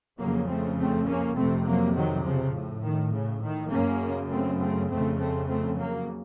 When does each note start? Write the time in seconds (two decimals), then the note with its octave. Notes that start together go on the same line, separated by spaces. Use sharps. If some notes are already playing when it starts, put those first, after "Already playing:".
0.19 F2 C#3 F#3 A#3
0.48 A3 C4
0.77 A3 C4
1.07 A#3 C#4
1.37 F2 C3 A3 C4
1.66 F#3 A#3
1.95 D#3 F#3
2.26 C#3 F3
2.54 A2
2.84 D#3
3.14 C#3
3.43 D#3
3.72 F#2 C#3 A#3 C#4
4.30 A3 C4
4.60 A3 C4
4.89 F2 C#3 A3 C4
5.19 A3 C4
5.48 A3 C4
5.77 F#3 A#3